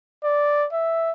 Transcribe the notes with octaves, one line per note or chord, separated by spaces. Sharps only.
D5
E5